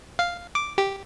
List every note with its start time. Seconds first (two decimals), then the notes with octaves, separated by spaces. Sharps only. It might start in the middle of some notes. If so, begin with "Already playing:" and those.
0.19 F5
0.55 D6
0.78 G4